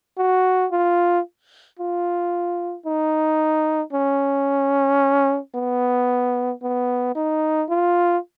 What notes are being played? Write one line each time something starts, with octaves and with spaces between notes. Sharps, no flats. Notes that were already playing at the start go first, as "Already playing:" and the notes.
F#4
F4
F4
D#4
C#4
B3
B3
D#4
F4